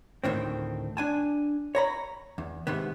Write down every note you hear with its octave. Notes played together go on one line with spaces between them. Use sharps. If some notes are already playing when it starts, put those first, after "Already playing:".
D2 A2 D#3 C4
D4 G#5 A5
C#5 A#5 B5
E2
G#2 C3 D#3 B3